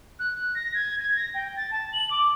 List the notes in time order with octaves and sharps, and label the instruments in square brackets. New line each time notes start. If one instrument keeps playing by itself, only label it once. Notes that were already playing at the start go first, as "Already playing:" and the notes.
[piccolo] F#6
A#6
G#6
G#6
A#6
G5
A6
A5
F#7
D6